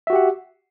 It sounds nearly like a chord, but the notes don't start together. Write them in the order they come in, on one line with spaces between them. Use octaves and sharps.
E5 F#4 G4 F#5